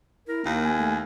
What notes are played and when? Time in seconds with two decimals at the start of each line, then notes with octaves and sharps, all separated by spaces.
0.28 E4 A#4
0.46 D#2 A#3
0.65 G#5
0.78 A3